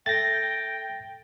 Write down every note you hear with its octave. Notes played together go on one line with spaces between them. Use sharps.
A3 G5 A6 A#6